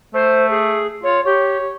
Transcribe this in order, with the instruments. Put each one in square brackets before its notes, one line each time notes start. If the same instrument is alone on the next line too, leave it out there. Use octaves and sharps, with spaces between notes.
[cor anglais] A3 [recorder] C5
[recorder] G#4
[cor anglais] F4 [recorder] C#5
[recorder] G4 [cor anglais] C#5